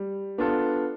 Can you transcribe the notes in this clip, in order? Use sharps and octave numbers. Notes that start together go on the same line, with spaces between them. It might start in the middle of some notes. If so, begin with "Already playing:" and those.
Already playing: G3
B3 D4 F4 A4